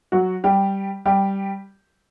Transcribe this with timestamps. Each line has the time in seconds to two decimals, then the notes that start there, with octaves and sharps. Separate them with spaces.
0.12 F#3 F#4
0.44 G3 G4
1.06 G3 G4